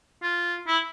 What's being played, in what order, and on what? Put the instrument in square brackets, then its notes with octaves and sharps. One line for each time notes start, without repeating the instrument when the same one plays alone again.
[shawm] F4
E4